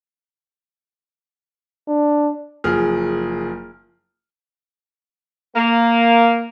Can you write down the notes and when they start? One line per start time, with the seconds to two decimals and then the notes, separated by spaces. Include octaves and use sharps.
1.88 D4
2.64 F#1 F3 G#4 F6
5.55 A#3